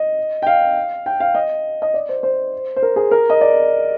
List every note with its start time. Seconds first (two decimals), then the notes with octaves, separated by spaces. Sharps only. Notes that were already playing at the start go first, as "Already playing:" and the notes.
Already playing: D#5
0.42 G5
0.47 F5
1.06 G5
1.20 F5
1.35 D#5
1.82 D#5
1.94 D5
2.09 C5
2.23 C5
2.76 C5
2.83 A#4
2.96 G#4
3.11 A#4
3.30 D#5
3.41 D5